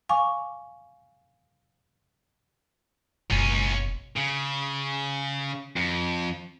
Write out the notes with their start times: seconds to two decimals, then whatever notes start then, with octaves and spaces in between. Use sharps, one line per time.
0.09 F5 G#5 C#6 D6
3.30 F#1 C#2 B2 C#4
4.17 C#3
5.76 F2